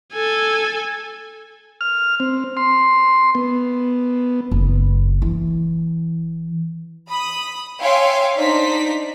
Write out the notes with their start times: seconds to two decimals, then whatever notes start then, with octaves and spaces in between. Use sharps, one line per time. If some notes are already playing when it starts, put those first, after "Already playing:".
0.13 A4 G#5
1.81 F6
2.20 C4
2.57 C6
3.35 B3
4.51 F#1
5.22 E3
7.08 B5 D#6
7.78 C#5 E5 F5 G5 G#5 C6
8.37 D4 D#4 C5 D5 B6